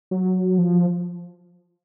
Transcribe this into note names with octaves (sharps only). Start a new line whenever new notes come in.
F#3
F3